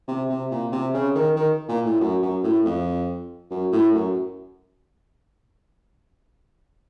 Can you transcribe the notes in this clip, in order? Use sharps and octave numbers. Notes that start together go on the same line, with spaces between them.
C3
C3
A#2
C3
C#3
D#3
D#3
A#2
A2
F#2
F#2
A2
F2
F#2
A2
F#2